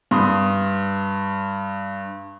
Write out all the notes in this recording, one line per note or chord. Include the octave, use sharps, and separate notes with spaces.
G2 C6 D#6